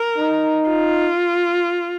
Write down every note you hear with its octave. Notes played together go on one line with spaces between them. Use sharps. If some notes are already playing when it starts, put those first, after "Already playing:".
Already playing: A#4
D#4
F4